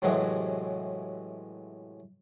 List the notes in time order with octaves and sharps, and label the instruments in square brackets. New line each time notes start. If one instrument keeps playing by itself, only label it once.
[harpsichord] A2 C3 E3 F#3 G#3